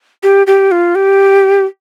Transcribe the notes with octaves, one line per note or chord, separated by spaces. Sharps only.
G4
G4
F4
G4